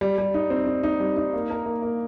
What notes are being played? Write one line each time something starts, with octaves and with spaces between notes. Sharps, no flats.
G3
G3
D#4
C4
D#4
D#4
G3
D#4
A#3
A#4
A#3
A#3